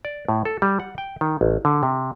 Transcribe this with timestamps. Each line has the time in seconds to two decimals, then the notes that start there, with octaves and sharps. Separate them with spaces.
0.05 D5
0.29 A2
0.45 A4
0.62 G3
0.80 F#5
0.98 G5
1.21 D#3
1.41 A1
1.65 D3
1.83 C3